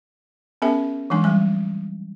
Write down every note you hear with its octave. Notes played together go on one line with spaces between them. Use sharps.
B3 C#4 G#4 A#4 E5 G#5
E3 F#3 G#3 D4 G#5
F#3 G3 G#5